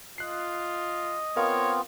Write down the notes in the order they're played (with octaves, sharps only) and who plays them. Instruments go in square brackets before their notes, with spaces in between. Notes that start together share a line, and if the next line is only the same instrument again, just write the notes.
[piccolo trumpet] F4 [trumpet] D#5 [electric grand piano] F#6 C7
[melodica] B3 C4 F4 [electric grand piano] A#4 F5 [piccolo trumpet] C#5